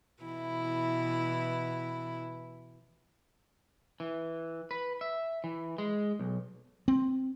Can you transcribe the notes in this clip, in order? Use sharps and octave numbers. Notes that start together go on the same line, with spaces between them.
B2 E3 E4
E3
B4
E5
E3
G#3
B1
C4